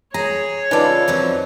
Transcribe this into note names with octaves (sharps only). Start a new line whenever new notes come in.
G#4 C#5 A#5
C#3 G#3 D4 D#4 F4 A4 B4 D5
F2 F3 F#3